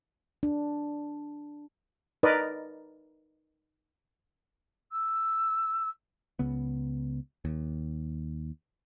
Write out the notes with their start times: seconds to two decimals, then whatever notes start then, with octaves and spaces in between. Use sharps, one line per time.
0.43 D4
2.23 D#4 A#4 B4 D5 D#5
4.92 E6
6.39 C#2 C#3 B3
7.45 D#2